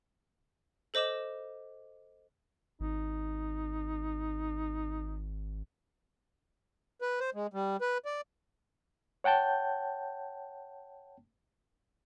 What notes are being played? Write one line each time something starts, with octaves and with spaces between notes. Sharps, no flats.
A4 C5 D#5 D6 E7
G#1 D#4
B4
C5
G#3
G3
B4
D5
C#5 F#5 G5 A5 G6